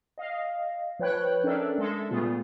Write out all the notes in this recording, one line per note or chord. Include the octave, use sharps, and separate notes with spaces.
D#5 F5
F3 B4 C#5 G5 F#6
C#4 D4 A4 A#4 D5 E5
G#3 A4 E5
A#2 G3 A3 B3 F4 G#4